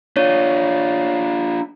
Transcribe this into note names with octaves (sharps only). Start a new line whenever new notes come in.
D4 F4 C#5